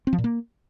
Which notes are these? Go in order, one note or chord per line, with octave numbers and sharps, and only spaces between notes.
C4
F3
A#2
A#3